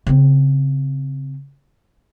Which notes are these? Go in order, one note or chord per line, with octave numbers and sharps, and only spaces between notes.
C#3 C4